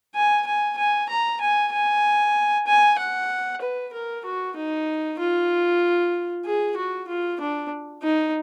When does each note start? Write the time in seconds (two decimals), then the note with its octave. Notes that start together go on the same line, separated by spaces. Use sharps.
0.15 G#5
0.47 G#5
0.78 G#5
1.09 A#5
1.41 G#5
1.73 G#5
2.67 G#5
2.99 F#5
3.61 B4
3.93 A#4
4.25 F#4
4.57 D#4
5.19 F4
6.45 G#4
6.77 F#4
7.08 F4
7.40 D4
8.03 D#4